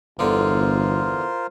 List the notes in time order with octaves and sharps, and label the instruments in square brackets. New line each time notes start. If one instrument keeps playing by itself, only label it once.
[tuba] G1 [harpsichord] E2 D3 F5 [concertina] F4 A#4 C5